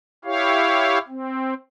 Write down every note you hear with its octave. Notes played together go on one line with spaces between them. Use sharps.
E4 G4 C#5 F5
C4